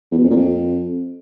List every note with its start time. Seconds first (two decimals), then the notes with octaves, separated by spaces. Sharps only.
0.12 E2
0.18 B2
0.24 F2
0.30 A#2
0.36 F2